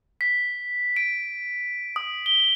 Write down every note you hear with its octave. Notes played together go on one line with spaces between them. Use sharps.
B6
D7
D#6
G7